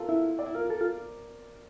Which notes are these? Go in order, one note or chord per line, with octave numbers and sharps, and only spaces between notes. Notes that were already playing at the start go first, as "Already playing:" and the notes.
Already playing: F4 A4 A#4
E4 E5
D5
E4
F4 A#4
A4
F4